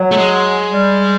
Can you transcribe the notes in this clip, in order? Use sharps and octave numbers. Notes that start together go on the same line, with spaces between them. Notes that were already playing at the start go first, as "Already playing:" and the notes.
Already playing: F#3
A3
G#3
G3